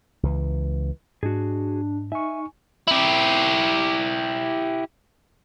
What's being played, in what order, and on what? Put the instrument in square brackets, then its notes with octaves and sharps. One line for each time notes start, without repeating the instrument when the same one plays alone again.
[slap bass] C#2 E3
[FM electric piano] G#2 [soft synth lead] D4 [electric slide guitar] F#4 G#4
[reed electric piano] D#4 C#6 [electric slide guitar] E5 [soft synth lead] G#5
[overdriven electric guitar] E4 G4